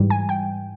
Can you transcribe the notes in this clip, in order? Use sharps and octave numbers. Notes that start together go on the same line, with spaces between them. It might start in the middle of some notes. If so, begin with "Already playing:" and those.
Already playing: G#2 E3 G3
G#5
G5